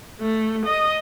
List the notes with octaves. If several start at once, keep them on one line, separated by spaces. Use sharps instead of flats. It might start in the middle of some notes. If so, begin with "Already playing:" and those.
A3
D#5